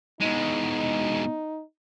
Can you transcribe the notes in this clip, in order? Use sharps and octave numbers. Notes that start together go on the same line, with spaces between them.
B2 G#3 D#4